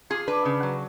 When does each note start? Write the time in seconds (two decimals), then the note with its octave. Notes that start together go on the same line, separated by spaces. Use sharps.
0.10 F4 G#4
0.28 D4 B4
0.45 C#3
0.63 F#3